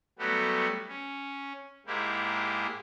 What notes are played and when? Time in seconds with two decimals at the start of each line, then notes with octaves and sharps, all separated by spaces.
0.19 F#3 G3 A3 B3 F#4 G4
0.88 C#4
1.86 G#2 G#3 A#3 E4 G4